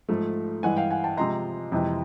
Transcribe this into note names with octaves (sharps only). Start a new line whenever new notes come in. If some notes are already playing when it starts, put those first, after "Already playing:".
G#2 F3 A3
G2 E3 G#3 F#5 G#5
F5 G5
F#5 G#5
G5 A5
C3 F3 G#3 A#5 C6
F2 C3 E3 G#3